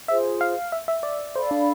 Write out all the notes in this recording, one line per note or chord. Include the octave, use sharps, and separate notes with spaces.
F4 G#4 C5 E5
F5
E5
E5
D5
A4 C5 D5 F5 B5
D4